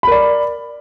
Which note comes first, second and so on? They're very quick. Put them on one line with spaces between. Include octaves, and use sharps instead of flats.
B5 A#4 D5